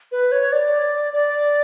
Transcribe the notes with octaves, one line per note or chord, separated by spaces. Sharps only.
B4
C#5
D5
D5